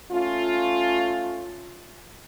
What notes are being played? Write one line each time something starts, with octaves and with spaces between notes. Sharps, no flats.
A3 C#4 F4